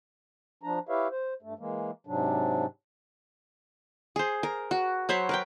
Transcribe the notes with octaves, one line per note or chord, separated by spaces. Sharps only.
F3 D4 A#5
E4 G4 B4 C#5 E5 F5
C5
G2 A3
E3 G#3 A#3
G#2 C3 F#3 D4
G#4 C5
A#4
F#4
F#3 C5 C#5 B5
A#4 B4 G5